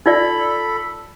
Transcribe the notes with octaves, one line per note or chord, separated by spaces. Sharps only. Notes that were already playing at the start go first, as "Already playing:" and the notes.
D#4 F4 A4 D5 B5